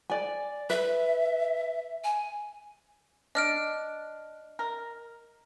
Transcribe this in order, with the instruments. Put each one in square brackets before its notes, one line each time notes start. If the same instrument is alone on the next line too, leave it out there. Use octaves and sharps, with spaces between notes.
[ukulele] D5 G#5
[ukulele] B4 [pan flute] E5
[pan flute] G#5
[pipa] D4 [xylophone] D#5 F6 D7
[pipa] A#4